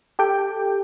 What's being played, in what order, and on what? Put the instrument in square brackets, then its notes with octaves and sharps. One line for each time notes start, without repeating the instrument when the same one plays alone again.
[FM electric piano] G4 A4 G5